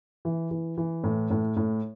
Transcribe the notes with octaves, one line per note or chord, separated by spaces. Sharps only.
E3
E3
E3
A2
A2
A2